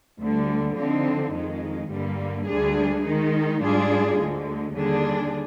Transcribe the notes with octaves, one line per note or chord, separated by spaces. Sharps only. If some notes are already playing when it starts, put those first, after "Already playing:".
D2 D3 G3
D3 F3 C4 D#4
F2 D#3 G#3
G2 D3 G3 A#3
D2 D3 G3 D4 G#4
D#3 G#3 D#4
G#2 G3 D4 F4 G#4
D2 D3 G#3
D#2 D3 G3 D4 G#4